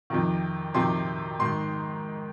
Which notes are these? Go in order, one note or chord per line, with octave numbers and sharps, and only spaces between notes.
F2 C3 D#3
F2 C3 D#3 C6
G#2 D#3 C6